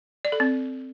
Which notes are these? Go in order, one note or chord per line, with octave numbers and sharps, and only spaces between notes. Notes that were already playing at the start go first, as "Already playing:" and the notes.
D5
A4
C4